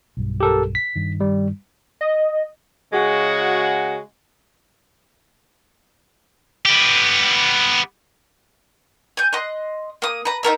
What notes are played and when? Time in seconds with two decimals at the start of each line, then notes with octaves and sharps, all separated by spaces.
0.17 B1 G2
0.40 G4 A4 A#4
0.75 B6
0.96 G2 D#3
1.20 G3
2.01 D#5
2.93 C#3 G#3 F#4
6.66 B3 G4
9.17 G#5 G6
9.33 D#5 C6 F#6
10.02 A#3 D#6
10.25 B4 A#5
10.43 D#4 F4 A#4 E5